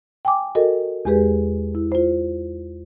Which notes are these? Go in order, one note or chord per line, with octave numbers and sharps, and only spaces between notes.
G5 G#5 D6
F#4 A4 A#4 D#5
E2 G#3 G4 G#4 B4
E4
F4 C5